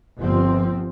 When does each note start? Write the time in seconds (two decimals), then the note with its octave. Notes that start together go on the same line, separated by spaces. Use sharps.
0.18 G1 F3 C4